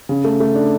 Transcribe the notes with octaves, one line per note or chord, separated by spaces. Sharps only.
C#3
A3
A3
D4